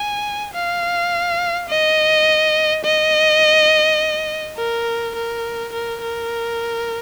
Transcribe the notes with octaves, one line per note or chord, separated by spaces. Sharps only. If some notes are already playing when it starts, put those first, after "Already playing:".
Already playing: G#5
F5
D#5
D#5
A#4
A#4
A#4
A#4